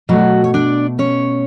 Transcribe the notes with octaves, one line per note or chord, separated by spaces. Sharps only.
B2 F#3 A3 F#4
C#5
D4 D5
C#4 C#5